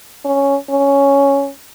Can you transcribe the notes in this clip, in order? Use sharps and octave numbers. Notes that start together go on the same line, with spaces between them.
C#4
C#4